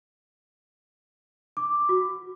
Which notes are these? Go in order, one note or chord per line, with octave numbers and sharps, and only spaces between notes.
D6
F#4